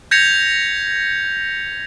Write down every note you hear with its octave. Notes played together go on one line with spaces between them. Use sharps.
G6 G#6 A#6 B6 C#7 F7